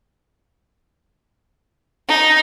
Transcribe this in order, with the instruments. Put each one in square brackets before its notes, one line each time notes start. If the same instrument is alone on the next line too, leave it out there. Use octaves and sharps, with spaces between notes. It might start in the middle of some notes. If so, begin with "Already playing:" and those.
[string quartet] D#4